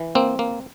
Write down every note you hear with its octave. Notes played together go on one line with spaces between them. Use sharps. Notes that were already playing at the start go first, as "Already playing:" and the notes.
Already playing: E3
A#3 C4
A#3